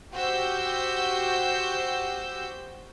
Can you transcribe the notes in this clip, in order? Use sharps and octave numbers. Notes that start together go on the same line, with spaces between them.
F#4 G4 C5 E6 G6